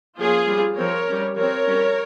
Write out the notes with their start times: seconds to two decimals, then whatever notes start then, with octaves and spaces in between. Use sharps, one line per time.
0.18 F3 A#3 C#4 F4 G#4
0.48 G3 C4
0.77 F3 C4 A#4 C#5
1.07 G3 C#4
1.37 F3 C4 A#4 C#5
1.67 G3 C#4